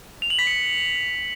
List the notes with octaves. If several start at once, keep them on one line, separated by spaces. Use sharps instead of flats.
F7
F#7
B6
C#7